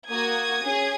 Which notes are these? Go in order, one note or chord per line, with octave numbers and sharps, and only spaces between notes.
A#3 F#4 D#6 G#6
C#4 G#4